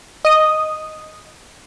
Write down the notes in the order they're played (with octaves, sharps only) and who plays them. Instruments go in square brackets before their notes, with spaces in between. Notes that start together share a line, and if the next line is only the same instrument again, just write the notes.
[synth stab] D#5 D#6